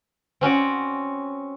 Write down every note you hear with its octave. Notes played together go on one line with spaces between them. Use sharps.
C4 C#4 F#4 D5